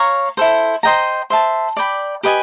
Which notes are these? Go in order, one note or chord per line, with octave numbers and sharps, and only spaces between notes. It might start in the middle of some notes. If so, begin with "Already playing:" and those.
Already playing: C#5 F5 A#5 C#6
E4 A4 C5
C5 D#5 G5 A#5
C5 E5 A5
D5 G5 B5
G4 B4 D#5 G#5